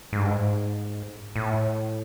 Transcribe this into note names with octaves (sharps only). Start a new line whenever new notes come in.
G#2
G2
G#2
A2